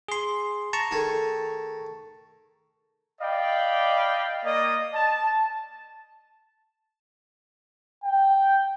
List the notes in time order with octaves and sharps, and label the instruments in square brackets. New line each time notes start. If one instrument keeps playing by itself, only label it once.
[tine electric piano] G#4 C6
A5 A#5 C#6
[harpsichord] D#3 A3 G#4
[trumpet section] D5 D#5 F5 G5 B5
A#3 D5 D#5
A5
[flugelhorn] G5